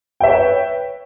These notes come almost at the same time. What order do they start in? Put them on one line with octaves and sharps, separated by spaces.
G5 E5 C#5 B4